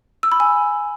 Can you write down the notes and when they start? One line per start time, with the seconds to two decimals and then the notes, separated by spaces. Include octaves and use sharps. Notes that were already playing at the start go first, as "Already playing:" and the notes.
0.23 E6
0.32 B5
0.40 G#5